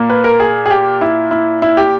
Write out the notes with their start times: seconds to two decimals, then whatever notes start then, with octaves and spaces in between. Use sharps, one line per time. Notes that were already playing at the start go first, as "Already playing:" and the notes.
Already playing: A#2 A#3
0.10 B4
0.24 A#4
0.40 G#4
0.66 G#4
0.70 G4
1.01 E4
1.31 E4
1.62 E4
1.77 G4